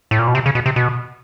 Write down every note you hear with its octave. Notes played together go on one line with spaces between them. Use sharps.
A2
A#2
B2
C3
C#3
B2
C3
B2